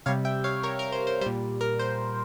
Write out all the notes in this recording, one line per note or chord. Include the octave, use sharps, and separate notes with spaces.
C3 G3 C#5 F5
E5 G5
C#5 F5
A#4 C#5
A#4
C5
C5
A#2 G3 C5
A#4
C5